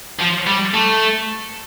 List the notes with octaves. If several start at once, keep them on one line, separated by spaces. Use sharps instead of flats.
F3
G3
A3